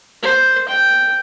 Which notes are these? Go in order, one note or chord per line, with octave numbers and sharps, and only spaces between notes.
C5
G5